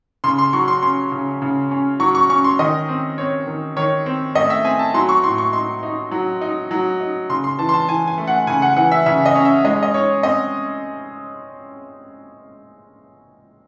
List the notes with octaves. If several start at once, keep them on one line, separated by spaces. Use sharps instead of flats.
C#3 C6
C6
F#3 C#6
C6
C#4 C6
C#3
C#3
C#4
F#3 C#6
C#6
C#4 C#6
C6
D#3 D#5
C4
C4 C#5
D#3
D#3 C#5
C4
A3 D#5
E5
C4 G#5
A5
F#3 C6
C#6
A2 C6
C#6
D#4 C6
D#4
F#3
D#4
F#3
D#4
C#3 C6
C6
E3 A5
C6
A5
E3 G#5
G#5
A3
F#5
C#3 G#5
F#5
E3 F#5
E5
C#3 E5
D#5
C#4
E5
G#3 D#5
D#5
D#4 C#5
C4 D#5